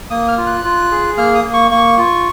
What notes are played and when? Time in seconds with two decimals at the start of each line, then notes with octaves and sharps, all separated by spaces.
0.10 A#3 D#6
0.28 F6
0.38 F4
0.47 F#6
0.64 F4
0.91 G#4
1.18 A#3 F6
1.35 D#6
1.44 A#3
1.53 C#6
1.71 A#3 C#6
1.98 F4